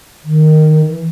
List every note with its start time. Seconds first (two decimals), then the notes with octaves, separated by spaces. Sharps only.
0.24 D#3
0.89 E3